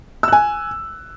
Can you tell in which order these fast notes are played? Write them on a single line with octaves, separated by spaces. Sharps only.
E6 F#6 G#5